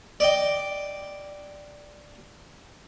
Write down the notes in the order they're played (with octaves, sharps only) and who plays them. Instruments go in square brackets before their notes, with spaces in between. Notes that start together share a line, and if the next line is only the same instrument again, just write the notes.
[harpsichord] D5 D#5 G5